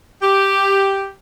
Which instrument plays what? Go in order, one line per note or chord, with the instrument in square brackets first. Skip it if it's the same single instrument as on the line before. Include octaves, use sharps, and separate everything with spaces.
[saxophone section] G4